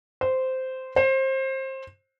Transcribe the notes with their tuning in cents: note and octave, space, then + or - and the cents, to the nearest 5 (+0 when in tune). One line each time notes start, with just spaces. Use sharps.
C5 -10
C5 +25